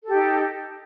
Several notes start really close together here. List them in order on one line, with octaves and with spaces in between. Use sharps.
A4 G4 D#4